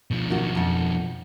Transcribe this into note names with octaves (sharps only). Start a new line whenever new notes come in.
B2 F3
D#3 F#4
F2 F#5